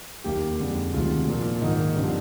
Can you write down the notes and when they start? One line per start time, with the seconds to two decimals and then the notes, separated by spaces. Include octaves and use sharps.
0.24 D#2 D#3 A#3 G4
0.59 F2 D3 G#3
0.93 D2 C3 D#3 G#3 F4
1.27 A#2 F3 A#3
1.61 G#2 D#3 A#3 D#4
1.95 G2 D3 F3 C4